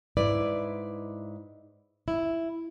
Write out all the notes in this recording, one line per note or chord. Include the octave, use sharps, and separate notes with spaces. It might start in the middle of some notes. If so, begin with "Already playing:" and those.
G#2 E4 B4 D5
E4